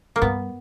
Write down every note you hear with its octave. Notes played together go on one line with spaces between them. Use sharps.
A#3
G2 B3